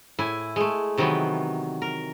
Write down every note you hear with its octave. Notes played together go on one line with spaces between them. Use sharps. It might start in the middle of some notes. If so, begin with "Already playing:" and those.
A2 E4 G#5
G#3 A3
C3 D#3 E3 F#3 B3
A#4